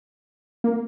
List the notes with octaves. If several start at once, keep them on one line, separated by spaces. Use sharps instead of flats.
A#3